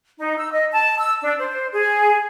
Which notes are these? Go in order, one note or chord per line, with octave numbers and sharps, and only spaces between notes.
D#4
E6
D#5
A5
E6
D4
C5
G#4